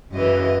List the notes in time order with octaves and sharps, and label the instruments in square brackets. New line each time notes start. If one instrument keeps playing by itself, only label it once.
[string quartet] F#2 C#3 E3 D#5